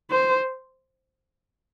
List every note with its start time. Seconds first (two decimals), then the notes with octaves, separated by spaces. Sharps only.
0.11 C5